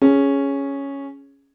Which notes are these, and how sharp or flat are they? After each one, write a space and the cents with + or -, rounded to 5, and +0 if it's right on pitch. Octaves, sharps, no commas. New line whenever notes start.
C#4 +0 G#4 +0